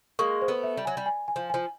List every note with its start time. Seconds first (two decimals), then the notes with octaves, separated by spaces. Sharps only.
0.19 G#3 A#3 C#6
0.42 C5
0.48 A3 B3
0.63 E5
0.77 G3
0.85 F#3 G#5
0.97 G3
1.06 G#5
1.28 G#5
1.36 F3
1.50 F3 G#5